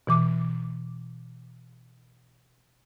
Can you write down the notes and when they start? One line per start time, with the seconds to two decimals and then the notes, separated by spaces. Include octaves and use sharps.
0.07 B2 E3 D6